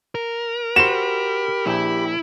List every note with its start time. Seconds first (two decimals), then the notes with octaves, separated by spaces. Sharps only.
0.15 A#4
0.76 F#4 G4 C5 B5 E7
1.67 A#1 E4 G5